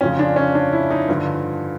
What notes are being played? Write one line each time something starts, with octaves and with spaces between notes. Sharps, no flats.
F2 C#3 F3 C#4
D4
C#4
D4
E4
D#4
G2 D3 F3